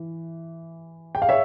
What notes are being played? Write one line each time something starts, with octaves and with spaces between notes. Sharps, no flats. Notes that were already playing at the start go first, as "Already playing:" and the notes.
Already playing: E3
G5
F5
C#5 E5